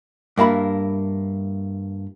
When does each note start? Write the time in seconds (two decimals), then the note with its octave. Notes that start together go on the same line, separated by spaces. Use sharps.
0.38 G2 A#3 E4 B5